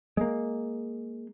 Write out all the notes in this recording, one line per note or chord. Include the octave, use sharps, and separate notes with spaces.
G#3 A#3